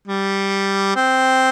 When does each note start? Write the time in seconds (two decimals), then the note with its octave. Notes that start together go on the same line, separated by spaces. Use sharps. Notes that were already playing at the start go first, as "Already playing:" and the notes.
0.08 G3
0.96 C4